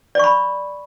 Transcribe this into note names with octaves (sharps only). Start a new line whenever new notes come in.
D5 B5 C#6